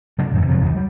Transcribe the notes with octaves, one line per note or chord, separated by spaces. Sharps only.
C#3 F#3 D4
F2 G#2 E3
C3 F3 F#3
D1 D#2
F#3 G3